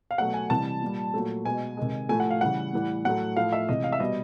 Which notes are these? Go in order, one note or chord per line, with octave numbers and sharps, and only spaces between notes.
F5
B2 F#3 A3 F#5
G#5
C3 E3 G3 A5
A#2 G3
A#2 F#3 A3
B2 G#3 G#5
C3 D#3 G#3
A2 F3 A3 G#5
F#5
F5
C#3 E3 G3 F#5
A2 E3 G3
A2 F#3 A3 F#5
A2 F3 A3 F5
E5
C3 E3 G#3 D#5
F5
E5
B2 G3 D#5